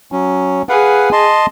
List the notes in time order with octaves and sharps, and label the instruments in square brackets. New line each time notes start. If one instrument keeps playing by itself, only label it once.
[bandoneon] F#3 C#4
[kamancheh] G#4 [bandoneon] B4 F5 F#5
[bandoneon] D#5 A5 C6